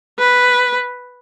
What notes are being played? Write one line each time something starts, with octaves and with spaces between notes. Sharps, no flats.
B4